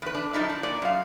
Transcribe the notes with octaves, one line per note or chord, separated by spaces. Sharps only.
E2 B4
D4
F#2 F3 D#4 E4
D4
A#2 D5
F#2 F5